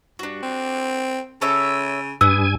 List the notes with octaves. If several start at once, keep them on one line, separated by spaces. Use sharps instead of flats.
G2 D4 F#4
C4
C#3 A4 C#5 E5
G2 B3 G#5 E6